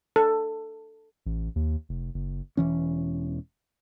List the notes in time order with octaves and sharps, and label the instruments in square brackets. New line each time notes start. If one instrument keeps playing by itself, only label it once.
[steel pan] A4
[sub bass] A1
D#2
F1
F#1
[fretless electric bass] E1 E3 C#4